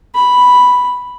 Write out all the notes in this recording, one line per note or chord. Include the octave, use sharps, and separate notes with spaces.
B5